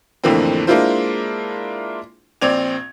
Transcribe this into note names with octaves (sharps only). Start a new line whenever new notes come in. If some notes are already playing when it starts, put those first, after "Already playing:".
F2 A2 D3 E3 A#3 C4
G#3 A#3 D4 E4 F4 C5
A#1 C4 D5 G#6 F7